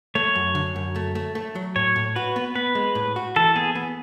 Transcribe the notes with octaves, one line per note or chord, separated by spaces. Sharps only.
A3 C#5
F#2
D3
F#2
A3
A3
A3
F#3
A2 C#5
A2
F#4 B4
B3
B3 B4
G#3
A2
F#4
E3 A4
B3 G#4
B3